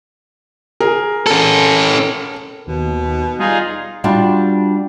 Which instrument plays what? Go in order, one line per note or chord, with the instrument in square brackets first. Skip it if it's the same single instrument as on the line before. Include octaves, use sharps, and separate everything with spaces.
[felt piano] G#4 A#4
[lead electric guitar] C#4 A4
[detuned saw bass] D#2 [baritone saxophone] B2
[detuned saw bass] G3 [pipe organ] D#4 F4 G#4
[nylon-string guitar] G3 D4 F4 F#4